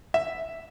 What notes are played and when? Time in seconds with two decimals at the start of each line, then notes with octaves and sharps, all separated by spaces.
0.14 E5